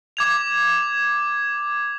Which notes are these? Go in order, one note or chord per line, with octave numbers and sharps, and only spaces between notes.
D6 G#6 F7